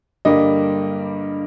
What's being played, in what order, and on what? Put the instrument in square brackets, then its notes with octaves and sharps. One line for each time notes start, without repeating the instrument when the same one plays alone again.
[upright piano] G2 D3 G3 A#3 D#5